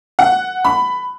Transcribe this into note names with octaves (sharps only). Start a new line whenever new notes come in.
F#5
B5